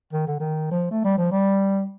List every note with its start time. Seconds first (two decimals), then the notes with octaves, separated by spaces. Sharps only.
0.13 D#3
0.27 D3
0.40 D#3
0.71 F3
0.91 A3
1.05 G3
1.18 F3
1.32 G3